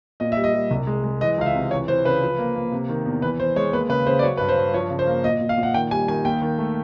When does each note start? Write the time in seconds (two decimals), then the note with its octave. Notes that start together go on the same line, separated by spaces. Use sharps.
0.20 A#2 D#5
0.32 E5
0.37 G3
0.44 D#5
0.54 G3
0.71 C2
0.87 G#3
1.04 G#3
1.21 E3 D#5
1.38 C#2 F5
1.46 E5
1.54 C3
1.71 E3 C#5
1.88 E3 C5
2.05 C#3 B4
2.22 F3
2.38 A#3
2.56 A#3
2.72 C3
2.89 D#3
3.06 E2
3.22 E3 B4
3.40 E3 C5
3.56 G#3 C#5
3.73 D#2 B4
3.89 C#3 B4
4.06 C#3 C5
4.19 D5
4.23 F#3 C#5
4.37 G2 B4
4.49 C5
4.57 G2
4.74 F3 C#5
4.90 C#3
4.99 C5
5.07 A#3
5.24 A#2 D#5
5.41 A#2
5.49 F5
5.58 A#2
5.63 F#5
5.74 D#3 G5
5.91 G3 G#5
6.08 D#3 G#5
6.24 D#2 G5
6.42 D#3
6.58 A3